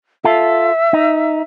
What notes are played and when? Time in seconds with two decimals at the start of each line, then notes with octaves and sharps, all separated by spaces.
0.24 F4 A4 E5
0.93 D#4